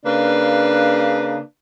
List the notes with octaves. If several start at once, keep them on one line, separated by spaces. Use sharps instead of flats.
C#3 A#3 D4 B4